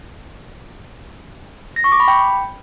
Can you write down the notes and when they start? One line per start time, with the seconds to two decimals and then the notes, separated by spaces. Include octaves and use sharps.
1.76 A#6
1.84 C#6
1.92 D6
2.00 B5
2.08 G5